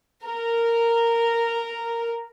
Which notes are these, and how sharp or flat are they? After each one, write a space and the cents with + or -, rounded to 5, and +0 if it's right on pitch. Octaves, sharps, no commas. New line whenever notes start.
A#4 -10